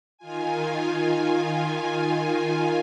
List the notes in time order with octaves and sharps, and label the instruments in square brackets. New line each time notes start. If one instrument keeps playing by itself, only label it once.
[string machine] D#3 F4 G#5